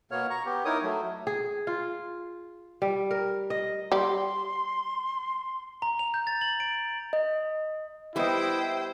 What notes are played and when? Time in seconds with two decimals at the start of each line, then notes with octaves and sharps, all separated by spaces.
0.11 B2 A#3 B3 C#5 F6
0.30 A#5 C#6
0.45 B3 G4
0.65 D#4 E4 A#4 C#5 D#6
0.83 F#3 A3
1.27 G#4
1.67 F4
2.82 G3
3.11 A#4
3.50 D#5
3.92 G3 C6
5.82 A#5
5.99 F7
6.14 G6
6.27 A6
6.41 F#7
6.60 D7
7.13 D#5
8.16 G3 B3 E4 G4 C5 D#5 G5